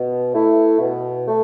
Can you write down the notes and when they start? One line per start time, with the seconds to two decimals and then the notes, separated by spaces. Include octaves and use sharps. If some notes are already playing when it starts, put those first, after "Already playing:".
Already playing: B2
0.33 A3 E4
0.80 B2
1.27 A3